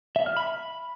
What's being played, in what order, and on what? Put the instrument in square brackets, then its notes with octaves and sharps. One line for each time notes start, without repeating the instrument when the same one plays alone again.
[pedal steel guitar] E5
F6
B5
B5